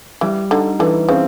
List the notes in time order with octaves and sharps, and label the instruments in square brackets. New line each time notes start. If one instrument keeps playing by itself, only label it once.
[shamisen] E3 [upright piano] G3
[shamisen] D3 [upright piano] D#4
[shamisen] D3 [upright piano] E3
[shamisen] C#3 [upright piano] C4